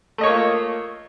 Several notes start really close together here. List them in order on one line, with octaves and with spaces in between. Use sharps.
A3 D#5 C#5 A#3 F4